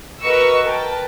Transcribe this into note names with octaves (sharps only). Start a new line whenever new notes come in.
F#4 A#4 B4 D#5 C#6 E6
A#4 B4 G5 A5